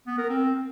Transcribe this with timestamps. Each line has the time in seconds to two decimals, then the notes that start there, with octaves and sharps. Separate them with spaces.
0.07 B3
0.18 A#4
0.29 C4